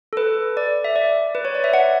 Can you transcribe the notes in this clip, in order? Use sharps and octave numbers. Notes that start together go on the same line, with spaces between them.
A4
B4
D5
E5
D5
B4
C#5
D5
E5
F#5